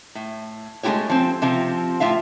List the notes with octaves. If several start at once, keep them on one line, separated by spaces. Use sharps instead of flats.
A2
G#3 A3 E4 F#4 G4 C#5
F3 C4
C3 F3 C4
A2 F4 E5 F5